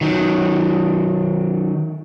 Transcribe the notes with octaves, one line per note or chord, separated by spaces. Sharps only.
D#3 F#3